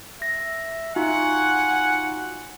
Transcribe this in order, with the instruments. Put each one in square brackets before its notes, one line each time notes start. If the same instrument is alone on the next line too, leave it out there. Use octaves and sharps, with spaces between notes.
[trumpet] E5 [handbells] A#6
[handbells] D#4 F4 F#4 [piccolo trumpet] F#5 [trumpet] G#5